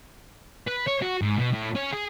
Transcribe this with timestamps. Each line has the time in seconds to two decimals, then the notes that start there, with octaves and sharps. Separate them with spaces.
0.67 B4
0.87 C#5
1.02 F#4
1.22 G#2
1.38 B2
1.54 A2
1.76 C#4
1.92 G#4